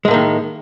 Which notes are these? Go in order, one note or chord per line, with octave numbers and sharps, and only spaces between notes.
A2 D#3 G#3 A#3